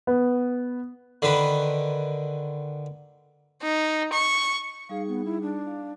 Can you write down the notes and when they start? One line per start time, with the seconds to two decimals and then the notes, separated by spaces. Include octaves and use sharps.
0.07 B3
1.22 D3 D#3 B4
3.62 D#4
4.13 C#6
4.89 G3 D#4 G#4 F5
5.08 B3
5.25 E4
5.42 D4
5.67 F5